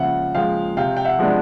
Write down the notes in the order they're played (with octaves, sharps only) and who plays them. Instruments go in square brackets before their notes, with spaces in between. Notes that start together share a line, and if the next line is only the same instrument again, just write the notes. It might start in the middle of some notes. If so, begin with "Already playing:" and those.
Already playing: [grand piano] C#3 F3 G#3 [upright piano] E5 F#5
[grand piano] F3 G#3 [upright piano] F5 G5
[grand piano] C3 [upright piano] F5 G5
[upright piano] G5
E5 F#5
[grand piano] F3 G#3 B3 D4